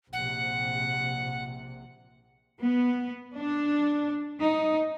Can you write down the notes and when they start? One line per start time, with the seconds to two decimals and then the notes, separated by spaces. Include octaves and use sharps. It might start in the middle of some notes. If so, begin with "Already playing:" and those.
0.13 A#1 C3 F#5
2.60 B3
3.36 D4
4.40 D#4